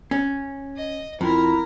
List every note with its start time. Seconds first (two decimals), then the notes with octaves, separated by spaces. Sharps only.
0.11 C#4
0.76 D#5
1.21 F2 E4 A#4 A#5